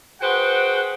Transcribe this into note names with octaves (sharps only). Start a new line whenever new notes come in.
F#4 G#4 B4 C5 F#5 G5